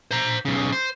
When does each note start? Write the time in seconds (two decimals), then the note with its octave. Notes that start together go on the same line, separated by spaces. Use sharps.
0.11 C5 A#5
0.45 B1 C#3
0.72 C5